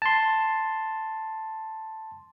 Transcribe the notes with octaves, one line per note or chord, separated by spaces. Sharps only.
A5 C6